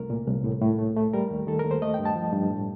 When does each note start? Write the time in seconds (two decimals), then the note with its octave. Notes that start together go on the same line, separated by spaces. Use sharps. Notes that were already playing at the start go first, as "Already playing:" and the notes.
Already playing: C2 A3 A#4
0.10 A#2
0.27 C2
0.44 A2
0.62 A2
0.78 A3
0.97 A3
1.13 G3 A#4
1.31 D#2
1.47 D#3 A4
1.59 A#4
1.64 D#2
1.71 C5
1.82 A3 D#5
1.94 G5
1.99 G2
2.05 A5
2.16 F3
2.33 G2
2.50 A2